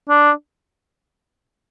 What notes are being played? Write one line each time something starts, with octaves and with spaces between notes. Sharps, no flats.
D4